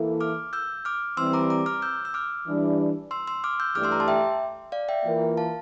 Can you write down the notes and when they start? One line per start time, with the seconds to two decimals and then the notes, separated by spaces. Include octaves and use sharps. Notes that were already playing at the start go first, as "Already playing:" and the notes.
Already playing: E3 A#3 E4 A4
0.21 D6 F6
0.53 E6 G6
0.85 D6 F6
1.17 E3 G3 C4 C6 E6
1.33 A#5 D6
1.50 A#5 D6
1.66 D6 F6
1.82 E6 G6
2.05 E6
2.14 D6 F6
2.47 E3 G3 D4
3.11 C6 E6
3.27 C6 E6
3.44 D6 F6
3.60 E6 G6
3.75 G2 E3 A3 D4 G4 D6 F6
3.84 C6 E6
3.92 A#5 D6
4.00 A5 C6
4.08 E5 G5
4.72 D5 F5
4.89 E5 G5
5.05 E3 A#3 F4 A#4
5.37 F5 A5